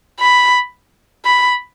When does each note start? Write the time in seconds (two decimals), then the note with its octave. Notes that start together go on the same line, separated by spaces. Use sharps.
0.20 B5
1.25 B5